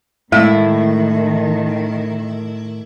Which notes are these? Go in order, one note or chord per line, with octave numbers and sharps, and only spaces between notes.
A2 D#3 G#3 A3 E4